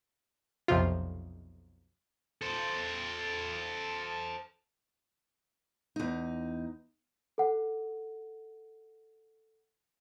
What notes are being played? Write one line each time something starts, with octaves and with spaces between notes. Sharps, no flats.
B1 F2 C3 F4
A4 C5
E2 D#4
A4 F#5